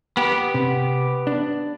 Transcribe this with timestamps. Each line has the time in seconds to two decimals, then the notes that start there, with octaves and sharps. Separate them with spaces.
0.17 B3 G4
0.54 C3
1.27 D4